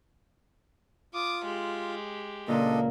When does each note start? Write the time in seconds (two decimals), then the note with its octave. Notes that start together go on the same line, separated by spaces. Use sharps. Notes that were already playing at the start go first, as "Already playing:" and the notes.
1.14 F4 D6 D#6
1.45 G#3 G4
2.48 C#2 A#2 A#3 D4 A4 D#5